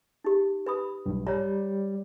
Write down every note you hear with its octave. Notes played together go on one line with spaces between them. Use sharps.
D#4 G4
B4 B5 D#6
B1 G2
G3 C#5 A#5